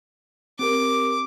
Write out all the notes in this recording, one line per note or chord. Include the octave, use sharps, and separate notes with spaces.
C4 G4 A#4 D6